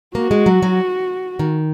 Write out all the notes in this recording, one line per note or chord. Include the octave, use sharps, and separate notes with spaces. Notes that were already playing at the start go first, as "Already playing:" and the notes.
A#3 F#4
G#3
F#3
F#3
D#3